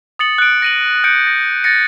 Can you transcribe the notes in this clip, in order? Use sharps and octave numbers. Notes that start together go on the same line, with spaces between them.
D#6 A6 C#7 F#7
F#6 D7
A#6 D#7 F#7
F#6 G6 C#7 D7
A#6
A6 A#6 C#7